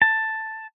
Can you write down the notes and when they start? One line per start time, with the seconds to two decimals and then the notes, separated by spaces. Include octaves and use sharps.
0.02 A5